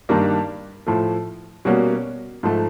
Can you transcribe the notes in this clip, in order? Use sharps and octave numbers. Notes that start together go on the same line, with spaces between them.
G2 D#3 G3 A#3
A2 F3 A3
B2 G3 A#3 C#4 F#4
G#2 F3 A3